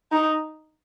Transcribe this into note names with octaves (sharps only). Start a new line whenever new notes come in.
D#4